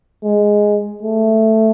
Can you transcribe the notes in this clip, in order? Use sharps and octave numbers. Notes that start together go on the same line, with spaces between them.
G#3
A3